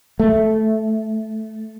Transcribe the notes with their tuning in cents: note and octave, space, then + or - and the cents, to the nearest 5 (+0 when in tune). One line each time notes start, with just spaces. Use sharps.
A3 -10